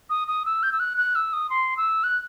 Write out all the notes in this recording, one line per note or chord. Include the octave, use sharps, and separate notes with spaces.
D#6
D#6
E6
G6
E6
F#6
F#6
E6
D#6
C6
E6
F#6